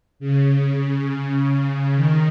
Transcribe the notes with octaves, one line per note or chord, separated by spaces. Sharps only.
C#3
D#3